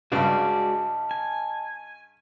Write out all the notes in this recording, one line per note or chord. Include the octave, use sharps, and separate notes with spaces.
G2 C#3 G#3 F#4 D5 D#5 A5
G#5